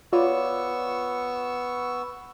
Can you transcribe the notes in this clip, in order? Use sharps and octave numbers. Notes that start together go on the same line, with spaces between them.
B3 F4 C#5 D5 C#6 E6